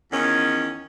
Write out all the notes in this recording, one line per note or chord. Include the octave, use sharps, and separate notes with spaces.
E2 D#3 C#4